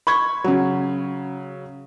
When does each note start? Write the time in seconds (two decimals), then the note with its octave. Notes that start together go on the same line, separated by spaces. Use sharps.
0.07 B5 C#6 G#6
0.44 C#3 F#3